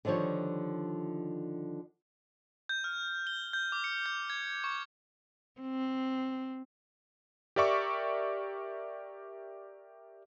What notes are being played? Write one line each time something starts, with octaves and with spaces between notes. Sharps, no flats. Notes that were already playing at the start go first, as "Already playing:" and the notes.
D3 D#3 F3 G3 C#5
G6
F6
G7
G6
D6
C#7
G6
G#6
C#6
C4
G4 A#4 D5 E5 C#6 D6